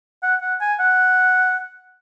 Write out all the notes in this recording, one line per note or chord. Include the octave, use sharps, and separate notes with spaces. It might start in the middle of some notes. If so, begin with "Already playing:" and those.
F#5
F#5
G#5
F#5